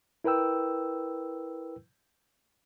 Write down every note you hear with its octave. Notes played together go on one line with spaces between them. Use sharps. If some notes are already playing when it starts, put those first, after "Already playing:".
E4 A#4 B4 G5 E6